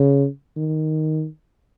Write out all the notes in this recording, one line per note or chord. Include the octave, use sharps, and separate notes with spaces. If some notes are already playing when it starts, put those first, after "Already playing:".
Already playing: C#3
D#3